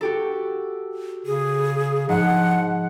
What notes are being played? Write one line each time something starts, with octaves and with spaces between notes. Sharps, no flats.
F#4 G4 A4
C#3 G#4
G#2 F3 F#5